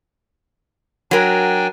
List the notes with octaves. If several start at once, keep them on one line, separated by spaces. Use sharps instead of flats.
F#3 D4 A#4 G5 G#5